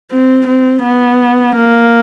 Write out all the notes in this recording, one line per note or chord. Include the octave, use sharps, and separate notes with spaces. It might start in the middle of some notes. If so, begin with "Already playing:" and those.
C4
C4
B3
A#3